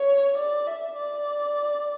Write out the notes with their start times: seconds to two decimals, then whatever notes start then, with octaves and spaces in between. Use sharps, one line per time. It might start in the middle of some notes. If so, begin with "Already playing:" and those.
Already playing: C#5
0.37 D5
0.67 E5
0.98 D5